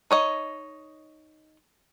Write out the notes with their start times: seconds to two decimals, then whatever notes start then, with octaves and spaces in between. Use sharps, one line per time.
0.11 D#4 C#5 D#5